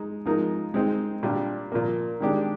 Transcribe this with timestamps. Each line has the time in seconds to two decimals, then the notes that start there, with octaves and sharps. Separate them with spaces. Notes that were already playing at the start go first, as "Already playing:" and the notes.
Already playing: G#3 D#4
0.25 F3 G#3 D#4 A#4
0.74 G#3 C4 D#4
1.23 A#2 G3 D4
1.72 A#2 F3 A#3
2.20 D#3 G#3 D4 G4